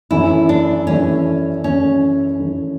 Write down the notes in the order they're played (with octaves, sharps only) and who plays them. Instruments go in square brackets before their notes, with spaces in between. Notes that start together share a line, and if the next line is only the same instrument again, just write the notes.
[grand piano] F#2 E3 A3 [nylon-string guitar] E4
[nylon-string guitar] D4
[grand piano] F#2 E3 A3 [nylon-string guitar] C#4
[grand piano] F#2 E3 A3 [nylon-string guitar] C#4
[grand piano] F#2 E3 A3